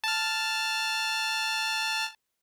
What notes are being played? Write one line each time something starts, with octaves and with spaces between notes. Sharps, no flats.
A5 F6